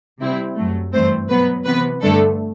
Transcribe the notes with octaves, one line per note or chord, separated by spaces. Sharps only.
C3 G3 C4 E4
F#2 F#3 A3
G2 E3 A3 C4 C5
B2 F#3 B3 B4
C3 E3 B3 B4
G2 D3 A3 D4 A4